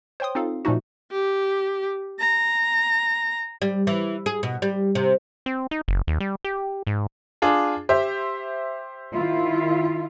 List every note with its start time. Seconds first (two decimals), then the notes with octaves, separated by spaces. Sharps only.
0.20 C5 C#5 G5 C6 D#6
0.35 C4 D#4 F4 A4 F5
0.65 A#2 F3 A3 D#4 F#4
1.12 G4
2.20 A#5
3.62 G3
3.87 E3
4.26 G#4
4.43 B2
4.62 G3
4.95 C3
5.46 C4
5.71 D#4
5.88 F#1
6.07 D#2
6.20 G3
6.44 G4
6.87 G#2
7.42 D4 F4 G#4
7.89 G4 C5 E5
9.15 D#3 E4 F4